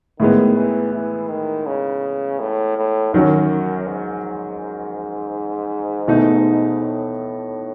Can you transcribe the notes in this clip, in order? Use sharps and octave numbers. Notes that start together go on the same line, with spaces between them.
A2 D#3 G#3 B3
E3
E3
D#3
C#3
A2
A2
F#2 D#3 F#3 C#4 F#4
G#2
B2 A3 D#4
A2